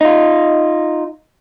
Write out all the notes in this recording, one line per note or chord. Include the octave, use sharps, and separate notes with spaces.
D#4 F4